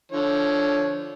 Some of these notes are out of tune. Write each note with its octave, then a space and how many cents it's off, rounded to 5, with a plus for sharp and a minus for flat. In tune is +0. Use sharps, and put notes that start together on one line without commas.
D3 -5 F3 -20 C#5 +0